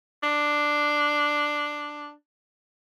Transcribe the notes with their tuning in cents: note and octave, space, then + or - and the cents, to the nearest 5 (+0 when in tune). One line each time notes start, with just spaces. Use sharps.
D4 +5